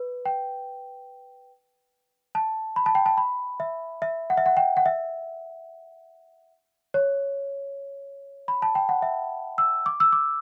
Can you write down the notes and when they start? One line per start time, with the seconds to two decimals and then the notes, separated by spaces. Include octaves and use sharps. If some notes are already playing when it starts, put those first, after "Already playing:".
Already playing: B4
0.26 G5
2.35 A5
2.76 B5
2.86 A5
2.95 G5
3.06 A5
3.18 B5
3.60 E5
4.02 E5
4.30 F#5
4.37 E5
4.46 F#5
4.57 G5
4.77 F#5
4.86 E5
6.94 C#5
8.48 B5
8.62 A5
8.75 G5
8.89 F#5
9.02 E5
9.58 E6
9.86 D6
10.00 E6
10.13 D6